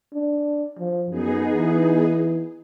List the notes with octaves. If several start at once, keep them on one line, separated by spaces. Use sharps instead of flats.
D4
F3
F#2 B3 D#4 G#4
E3